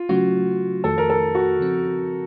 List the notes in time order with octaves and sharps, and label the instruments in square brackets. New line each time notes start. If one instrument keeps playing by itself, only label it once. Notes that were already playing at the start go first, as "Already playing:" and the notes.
Already playing: [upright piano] F4
[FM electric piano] C#3 F#3 A3 C#4 [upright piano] F#4
[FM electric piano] F2 D#3 A3 [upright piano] A4
[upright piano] A#4
A4
F#4
[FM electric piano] C#3 F3 C4